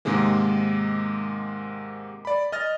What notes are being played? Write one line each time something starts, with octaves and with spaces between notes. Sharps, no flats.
G#2 C3 D#3 G#3 A#3
D5 B5
D#5 F6 A6